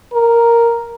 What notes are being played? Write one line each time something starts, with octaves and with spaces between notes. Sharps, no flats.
A#4